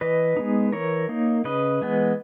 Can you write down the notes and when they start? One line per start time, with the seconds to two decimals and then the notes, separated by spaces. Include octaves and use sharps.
0.01 E3 B4 D#5
0.37 G#3 B3 D#4
0.72 E3 A#4 C#5
1.09 A#3 D#4
1.45 C#3 B4 D#5
1.81 E3 G#3 B3